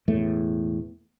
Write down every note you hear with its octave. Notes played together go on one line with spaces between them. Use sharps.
E1 E2 A2 A3